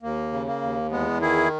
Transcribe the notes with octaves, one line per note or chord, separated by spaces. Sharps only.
D#2 A#3
C#3
A#3
D#2
E2 G#3 B3
D#3 E4 G#4